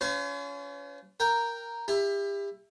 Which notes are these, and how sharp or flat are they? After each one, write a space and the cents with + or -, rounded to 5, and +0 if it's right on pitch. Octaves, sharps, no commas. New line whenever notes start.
C#4 +30 F4 +0 C5 -40
A#4 +0 G5 +0
E4 +10 G4 +35